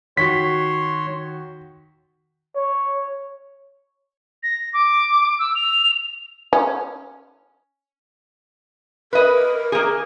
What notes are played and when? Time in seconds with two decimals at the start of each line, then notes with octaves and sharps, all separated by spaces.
0.17 D#3 F#4 C#5 C6 B6
2.55 C#5
4.43 A#6
4.73 D6
5.39 E6
5.55 F7
6.53 C#4
9.13 A#4 B4 D#5
9.72 A#3 G#4